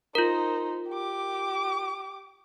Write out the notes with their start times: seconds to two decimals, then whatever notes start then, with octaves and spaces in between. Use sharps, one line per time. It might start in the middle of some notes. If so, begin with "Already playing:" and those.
0.15 D#4 F4 A#4 C5
0.89 G4 D6